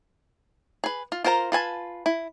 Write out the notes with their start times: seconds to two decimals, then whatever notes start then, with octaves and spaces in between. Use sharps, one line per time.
0.84 G#4 B4
1.12 F4
1.24 F4 A#4 C5 G#5 A#5
1.52 F4 B4 G#5 A5
2.06 E4